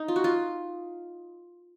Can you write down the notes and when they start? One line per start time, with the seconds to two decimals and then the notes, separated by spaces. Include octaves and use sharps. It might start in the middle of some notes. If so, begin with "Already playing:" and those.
Already playing: D#4
0.08 F4
0.16 F#4
0.24 F4